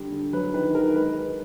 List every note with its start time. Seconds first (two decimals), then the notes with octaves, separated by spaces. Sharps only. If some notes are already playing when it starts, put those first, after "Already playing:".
Already playing: D3 G3
0.12 D3
0.33 F#3 B4
0.53 D#3 B4
0.75 D#3 A#4
0.96 G#3 B4
1.17 G#3